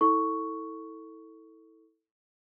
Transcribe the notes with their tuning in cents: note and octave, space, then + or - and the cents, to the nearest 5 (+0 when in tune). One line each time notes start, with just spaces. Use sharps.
E4 -25 A4 +10 C#6 +5